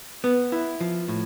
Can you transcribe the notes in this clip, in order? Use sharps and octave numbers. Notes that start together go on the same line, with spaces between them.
B3
E4
F3
A2